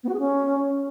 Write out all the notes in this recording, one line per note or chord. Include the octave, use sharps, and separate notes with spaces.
B3
F#4
G#4
C#4